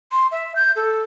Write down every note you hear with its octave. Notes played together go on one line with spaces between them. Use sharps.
C6
E5
G6
A4